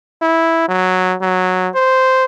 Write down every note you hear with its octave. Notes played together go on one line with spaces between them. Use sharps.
E4
F#3
F#3
C5